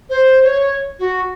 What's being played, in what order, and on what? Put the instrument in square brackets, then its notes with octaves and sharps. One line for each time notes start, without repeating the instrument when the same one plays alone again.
[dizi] C5
C#5
F#4